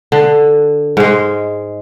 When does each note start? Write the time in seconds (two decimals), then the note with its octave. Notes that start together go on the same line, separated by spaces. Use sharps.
0.12 D3
0.97 G#2 G#3